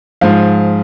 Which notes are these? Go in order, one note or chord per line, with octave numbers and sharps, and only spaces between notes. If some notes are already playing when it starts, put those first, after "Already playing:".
G#2 F3 F5